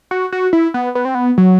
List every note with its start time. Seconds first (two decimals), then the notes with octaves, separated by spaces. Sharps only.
0.11 F#4
0.32 F#4
0.53 E4
0.74 B3
0.95 B3
1.05 C4
1.15 B3
1.38 F#3